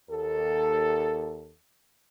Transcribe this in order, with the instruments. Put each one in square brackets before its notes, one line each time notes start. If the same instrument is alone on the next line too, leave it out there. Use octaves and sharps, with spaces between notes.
[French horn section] D#2 A4